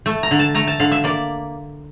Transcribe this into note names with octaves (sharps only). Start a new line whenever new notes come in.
A3
A#5
D3
A5
A3 A#5
A5
D3 F5
E5
A#3 D5